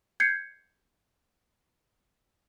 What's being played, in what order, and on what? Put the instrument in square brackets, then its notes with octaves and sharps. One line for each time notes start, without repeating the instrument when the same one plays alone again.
[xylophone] G6 G#6 C7 C#7